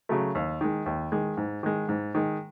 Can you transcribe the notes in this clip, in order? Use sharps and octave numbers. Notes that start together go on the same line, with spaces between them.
C#3 F#3 A3
D#2
D#3 G#3
D#2
D#3 G#3
G#2
D#3 G#3
G#2
D#3 G#3